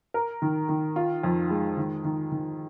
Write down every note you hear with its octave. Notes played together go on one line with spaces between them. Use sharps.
A#4
D#3
D#3
F4
F2
G#3
D#3
D#3
D#3